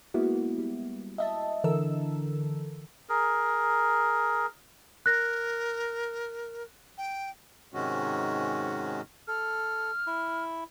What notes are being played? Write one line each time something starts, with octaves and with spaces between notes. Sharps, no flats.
G#3 A#3 B3 E4 F#4
G3
D#5 E5 A5
D3 E3 A4 A#4 E6
G#4 A#4
A#4 F#6 A#6
G5
G#2 C3 D#3 G#3 C#4 F#4
A4 F6
E4